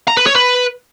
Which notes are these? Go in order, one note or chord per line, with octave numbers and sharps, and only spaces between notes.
A#5
B4
C#5
B4